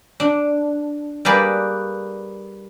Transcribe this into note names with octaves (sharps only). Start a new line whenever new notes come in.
D4
G3 A#3 G#4 B4 D5